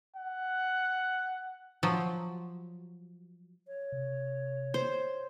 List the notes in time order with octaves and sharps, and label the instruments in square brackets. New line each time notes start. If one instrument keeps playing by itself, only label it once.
[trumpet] F#5
[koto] F3 F#3
[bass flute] C#5
[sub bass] C3
[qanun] C5